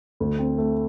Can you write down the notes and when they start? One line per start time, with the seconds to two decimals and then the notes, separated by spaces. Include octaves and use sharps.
0.20 D2
0.39 C4
0.58 A3